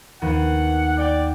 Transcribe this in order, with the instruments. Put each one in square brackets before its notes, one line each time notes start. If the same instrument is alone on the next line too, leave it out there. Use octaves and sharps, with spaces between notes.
[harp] D#2 B3 [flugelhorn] F#5
[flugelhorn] D5 [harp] F#5 G5